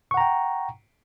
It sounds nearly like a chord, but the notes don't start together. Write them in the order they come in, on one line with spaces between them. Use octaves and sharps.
C#6 F#5 A#5 G5